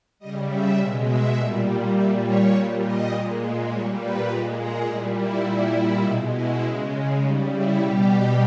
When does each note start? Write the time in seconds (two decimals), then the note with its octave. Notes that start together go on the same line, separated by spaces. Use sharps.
0.19 C#3 G3 D#5
0.48 E5
0.78 B2 G#3
1.07 E5
1.36 A#2 G3
1.95 A#2 G3 E5
2.23 C#5
2.53 A#2 G3
2.82 D#5
3.11 A#2 G#3
3.70 A#2 G3 C#5
3.98 B4
4.28 A#2 G#3 A#4
4.57 G#4
4.86 A#2 G3 E4
5.16 E4
5.45 A#2 G3 E4
6.03 B2 G#3 D#4
6.33 E4
6.62 C#3 G#3
7.20 C#3 G3 D#4
7.49 E4
7.78 B2 G3 G4